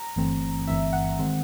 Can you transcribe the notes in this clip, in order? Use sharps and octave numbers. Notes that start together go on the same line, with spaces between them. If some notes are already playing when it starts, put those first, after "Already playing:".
Already playing: A#5
G1 G2 E3 A3 C4
G1 G2 E3 A3 C4 E5
F#5
D#3 G#3 C4